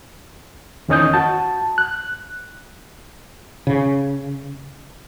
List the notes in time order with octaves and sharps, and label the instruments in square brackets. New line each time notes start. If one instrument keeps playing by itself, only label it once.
[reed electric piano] E2 D#3 C#4 D#5 D#6 G6
F#4 A5
F#6
[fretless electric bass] C#3